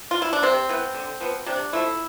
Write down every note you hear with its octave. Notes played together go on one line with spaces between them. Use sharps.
F4
E4
D4
C3 C4
E3 B3
D3
F3 B3
C3 D4
F3 A3 E4